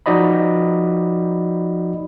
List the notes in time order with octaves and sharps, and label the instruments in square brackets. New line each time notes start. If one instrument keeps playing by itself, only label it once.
[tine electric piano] F3 D#4 F#4 D5 D#5 B5